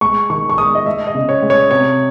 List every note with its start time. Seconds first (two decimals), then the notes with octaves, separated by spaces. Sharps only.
0.01 G#3 C#6
0.30 D#3 C#6
0.50 C#6
0.58 G#3 D#6
0.75 D#5
0.86 G#3 E5
1.07 D#5
1.15 C#3
1.29 C#5
1.42 G#3
1.50 C#5
1.71 C3 C#5